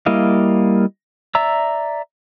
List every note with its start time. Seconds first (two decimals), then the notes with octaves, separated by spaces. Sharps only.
0.06 G3 A#3 E4 D#5 F5
1.35 D5 E5 A#5 E6